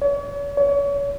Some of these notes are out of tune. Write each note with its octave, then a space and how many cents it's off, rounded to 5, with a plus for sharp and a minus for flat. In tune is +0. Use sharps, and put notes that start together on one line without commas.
C#5 +40
C#5 +35